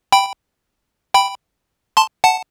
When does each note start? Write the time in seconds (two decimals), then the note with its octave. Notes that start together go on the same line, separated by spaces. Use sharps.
0.12 G5 B5
1.14 G5 B5
1.97 A5 C6
2.24 F#5 A5